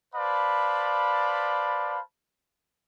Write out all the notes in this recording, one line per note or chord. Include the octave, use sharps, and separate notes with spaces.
B4 C5 D5 F5 A5 B5